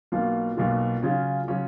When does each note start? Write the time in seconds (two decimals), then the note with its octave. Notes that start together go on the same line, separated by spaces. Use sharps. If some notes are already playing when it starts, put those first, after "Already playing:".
0.12 B1 B2 A#3 F4
0.57 B1 B2 A#3 F4
1.03 C#3 F#3 C#4 F4
1.48 C#3 F#3 C#4 F4